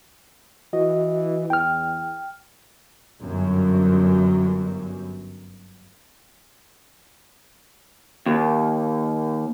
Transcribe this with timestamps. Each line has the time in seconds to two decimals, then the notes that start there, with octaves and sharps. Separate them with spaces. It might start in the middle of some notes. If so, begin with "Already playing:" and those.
0.73 E3 F#4 D#5
1.50 E2 G5 F6
3.19 G1 F#2
8.26 D#2